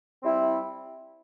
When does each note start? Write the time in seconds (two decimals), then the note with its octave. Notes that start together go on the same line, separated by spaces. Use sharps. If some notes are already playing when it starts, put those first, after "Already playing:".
0.21 G3 C4 E4